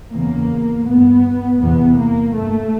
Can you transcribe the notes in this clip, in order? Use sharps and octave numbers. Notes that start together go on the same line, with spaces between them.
E2 C#3 A#3
G2 B3
E2 C3 B3
A#3
G2 A3